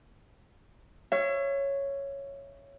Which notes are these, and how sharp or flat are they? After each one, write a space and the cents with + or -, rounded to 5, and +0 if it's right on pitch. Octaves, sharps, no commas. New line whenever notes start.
C#5 +0 E5 +40